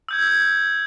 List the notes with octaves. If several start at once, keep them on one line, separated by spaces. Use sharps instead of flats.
E6 G6 G#6